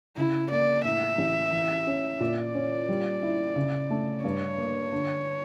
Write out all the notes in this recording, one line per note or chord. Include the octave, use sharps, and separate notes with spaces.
C#3 E4
A#3 D5
A2 E5
A1
E3
C#4
A#2 D5
C#4
G3
E4
C#3
A3
G2 C#5
A#3
D3